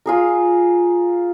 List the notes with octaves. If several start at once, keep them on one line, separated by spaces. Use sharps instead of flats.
F4 G#4 A#4